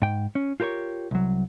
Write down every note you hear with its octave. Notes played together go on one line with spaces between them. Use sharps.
G#2 G5
C#4
F4 G4 A#4 B4 C#5
C2 F#3